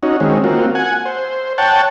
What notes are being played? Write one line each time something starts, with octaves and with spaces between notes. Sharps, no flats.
C#4 D#4 F#4
D#3 G#3 C4 C#4
A#3 C4 F4 F#4
F#5 G#5
C5
C#5 F#5 G5 A5